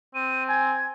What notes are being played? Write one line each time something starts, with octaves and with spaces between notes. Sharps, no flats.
C4 D#7
G#5 G#6